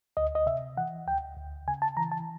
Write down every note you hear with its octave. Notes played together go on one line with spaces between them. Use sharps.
D2 D#5
D#5
C3 E5
E3 F#5
D2 G5
D2
C#3 G#5
A5
E3 A#5
A5